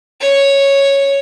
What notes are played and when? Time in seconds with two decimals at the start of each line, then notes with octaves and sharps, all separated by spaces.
0.21 C#5